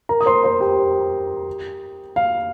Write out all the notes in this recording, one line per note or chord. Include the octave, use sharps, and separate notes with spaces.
A#4 A#5
D#6
C5 C6
C5 C6
G4 G5
F5